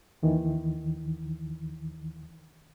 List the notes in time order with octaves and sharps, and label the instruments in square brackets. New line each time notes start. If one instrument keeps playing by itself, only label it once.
[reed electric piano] D#2 D#3 E3